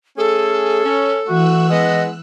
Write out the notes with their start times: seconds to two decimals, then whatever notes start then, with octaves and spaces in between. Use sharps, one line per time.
0.18 A3 C#4 G#4 A4
0.84 C#4
1.28 E3 A3 F#4 E6 F#6
1.70 G#3 B3 D#5